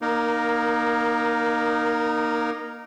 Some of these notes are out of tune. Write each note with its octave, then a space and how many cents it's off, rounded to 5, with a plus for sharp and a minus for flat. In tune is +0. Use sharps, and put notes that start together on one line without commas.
A#3 +20 D#4 -20 A#4 +0